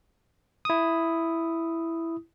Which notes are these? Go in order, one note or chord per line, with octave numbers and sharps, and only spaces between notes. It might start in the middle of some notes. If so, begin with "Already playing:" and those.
E4 D#6